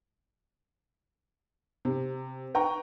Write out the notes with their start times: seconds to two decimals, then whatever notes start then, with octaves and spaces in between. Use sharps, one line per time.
1.85 C3
2.54 B4 G5 A#5 C#6